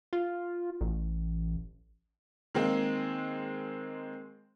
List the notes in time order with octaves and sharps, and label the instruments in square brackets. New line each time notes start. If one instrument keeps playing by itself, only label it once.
[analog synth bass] F4
A1
[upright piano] D#3 G#3 A#3 C4